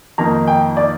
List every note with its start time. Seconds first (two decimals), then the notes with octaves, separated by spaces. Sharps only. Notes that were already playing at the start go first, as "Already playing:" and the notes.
0.18 F2 D#3 A#3 D#4 A#5
0.48 G5
0.77 D5